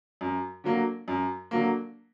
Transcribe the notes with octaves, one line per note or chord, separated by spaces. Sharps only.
F#2
D3 F#3 A#3
F#2
D3 F#3 A#3